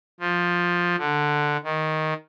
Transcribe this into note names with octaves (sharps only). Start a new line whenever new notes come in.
F3
D3
D#3